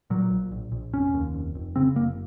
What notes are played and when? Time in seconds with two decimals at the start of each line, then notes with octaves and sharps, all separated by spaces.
0.10 A#2 F#3
0.30 A#1
0.52 A#1
0.72 A#1
0.93 F1 C#4
1.14 D#2
1.34 F1
1.55 F1
1.76 C#3 C4
1.96 F#1 A#3